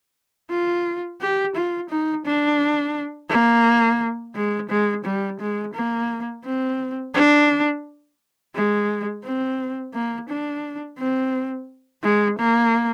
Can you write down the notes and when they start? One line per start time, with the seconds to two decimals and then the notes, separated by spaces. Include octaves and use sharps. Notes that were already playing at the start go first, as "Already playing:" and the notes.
0.51 F4
1.21 G4
1.56 F4
1.90 D#4
2.26 D4
3.30 A#3
4.35 G#3
4.70 G#3
5.05 G3
5.40 G#3
5.74 A#3
6.45 C4
7.14 D4
8.55 G#3
9.24 C4
9.94 A#3
10.30 D4
10.99 C4
12.03 G#3
12.39 A#3